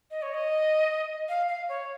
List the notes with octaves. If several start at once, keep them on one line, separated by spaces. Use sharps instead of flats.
D#5
C#5
D#5
F5
F5
C#5